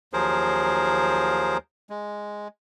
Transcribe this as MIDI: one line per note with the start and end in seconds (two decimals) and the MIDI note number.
0.13 1.57 39
0.13 1.57 53
0.13 1.57 54
0.13 1.57 68
0.13 1.57 70
0.13 1.57 72
1.90 2.48 56